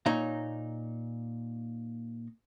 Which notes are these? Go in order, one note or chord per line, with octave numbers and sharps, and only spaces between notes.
A#2 D#4 C#5 A#5